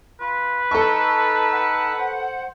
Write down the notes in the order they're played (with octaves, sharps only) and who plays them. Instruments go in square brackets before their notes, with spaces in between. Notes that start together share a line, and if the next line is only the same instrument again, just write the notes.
[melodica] F4 [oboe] B4
[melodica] D#4 A5 E6 [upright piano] A4 C#6 [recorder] A#5
[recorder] F#5
[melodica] C5